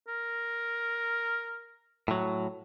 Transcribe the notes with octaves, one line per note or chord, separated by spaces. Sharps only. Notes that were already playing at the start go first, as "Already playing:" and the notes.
A#4
A2 F#3